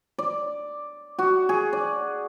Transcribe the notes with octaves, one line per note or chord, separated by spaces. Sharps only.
D5
F#4
G#4
D5